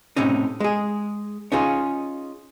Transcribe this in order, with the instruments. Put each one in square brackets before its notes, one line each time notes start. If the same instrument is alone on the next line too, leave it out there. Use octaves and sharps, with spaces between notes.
[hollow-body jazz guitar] A2 C3 C#4 D#4
G#3 G#4
C#4 D#4 F4 G#4